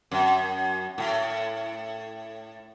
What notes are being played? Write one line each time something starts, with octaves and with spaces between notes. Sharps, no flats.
F#2
A2